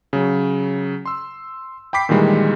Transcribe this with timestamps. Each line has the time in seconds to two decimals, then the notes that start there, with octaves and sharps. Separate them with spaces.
0.13 C#3 F#3
1.06 C6 E6
1.93 G5 B5 D6 B6 C7
2.09 A#2 D#3 E3 G3 G#3